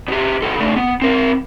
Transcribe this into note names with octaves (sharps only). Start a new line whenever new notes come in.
B2 G4
C2 A4
C#3 A3
B3
C4 A#4